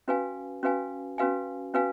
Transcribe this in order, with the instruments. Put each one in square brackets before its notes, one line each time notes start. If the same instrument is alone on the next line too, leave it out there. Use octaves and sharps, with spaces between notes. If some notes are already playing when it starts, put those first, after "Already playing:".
[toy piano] C#4 F#4 B4 F5 G#5
C#4 F#4 B4 F5 G#5
C#4 F#4 B4 F5 G#5
C#4 F#4 B4 F5 G#5